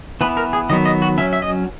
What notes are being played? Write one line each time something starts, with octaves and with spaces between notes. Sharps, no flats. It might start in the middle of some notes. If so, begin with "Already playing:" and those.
E3 B3 B4
A#4
G#4
D#3 F#3 B3 D#5
D#5
F#4
F#3 C#4 E5
E5
D#5